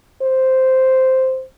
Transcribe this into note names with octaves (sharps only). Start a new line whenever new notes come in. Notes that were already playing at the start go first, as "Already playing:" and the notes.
C5